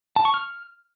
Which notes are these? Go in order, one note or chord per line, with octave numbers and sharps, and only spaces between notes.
A5
C#6
F6